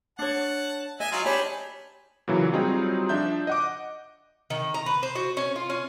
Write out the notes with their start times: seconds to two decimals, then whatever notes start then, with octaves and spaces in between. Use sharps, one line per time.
0.19 D4 C#5 F#5 A5
1.00 D#5 E5 G#5
1.12 F#3 D#4 F4
1.25 D4 D#4 G4 C#5 G#5 B5
2.28 A#2 C#3 E3 F#3
2.52 F#3 G3 C4 D#4 F4 G#4
3.09 F3 D4 E5 G6
3.47 D#5 F#5 D6
4.50 D#3
4.74 A#5
4.86 B4
5.03 C5
5.15 F#4
5.37 C#4
5.56 F4
5.70 C#4